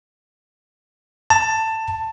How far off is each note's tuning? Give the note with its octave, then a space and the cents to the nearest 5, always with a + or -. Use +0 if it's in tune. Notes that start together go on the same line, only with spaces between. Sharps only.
A5 +15